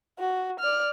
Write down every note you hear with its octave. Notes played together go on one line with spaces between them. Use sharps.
F#4
D5 F6